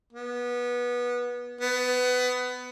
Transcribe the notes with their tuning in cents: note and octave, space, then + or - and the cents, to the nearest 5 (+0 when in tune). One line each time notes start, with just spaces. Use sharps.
B3 -20
B3 +20